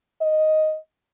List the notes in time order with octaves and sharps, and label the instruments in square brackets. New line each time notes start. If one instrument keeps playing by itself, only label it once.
[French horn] D#5